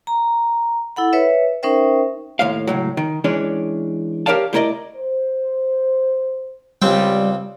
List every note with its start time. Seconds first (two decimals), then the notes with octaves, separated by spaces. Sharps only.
0.07 A#5
0.96 E4 A4 F#5 B5
1.13 B4 C#5 E5
1.63 C#4 D#4 A#4 C5 E5 G5
2.39 D#2 A2 C#5 F5
2.67 C#2 A2 F#3
2.97 D#3
3.24 E3 G#3 C#4 D4 C#5
4.26 G4 A#4 C#5 D5 F5 A5
4.53 G3 A3 E4 A#4 D5 D#5
4.96 C5
6.82 C#2 G3 C4 G5